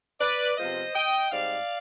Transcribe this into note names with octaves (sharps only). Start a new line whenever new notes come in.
B4 D5
C3 F3 G#3 B3 F4 C5 D#5
D#5 G5
G#2 G3 C4 D#4 D5 F5